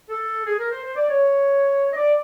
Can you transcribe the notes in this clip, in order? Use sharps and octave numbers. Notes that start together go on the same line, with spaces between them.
A4
G#4
A#4
C5
C5
D5
C#5
D#5
D5